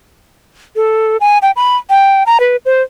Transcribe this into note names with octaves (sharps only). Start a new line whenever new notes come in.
A4
G#5
G5
B5
G5
A#5
B4
C5